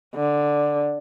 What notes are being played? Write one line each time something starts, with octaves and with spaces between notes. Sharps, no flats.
D3